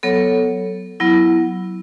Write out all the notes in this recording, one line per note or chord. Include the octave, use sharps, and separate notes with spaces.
F#3 B3 A4 C#5
F#3 B3 E4